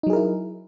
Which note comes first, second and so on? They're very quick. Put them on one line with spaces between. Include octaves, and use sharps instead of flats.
D#4 F#3 G#4 A#4 E4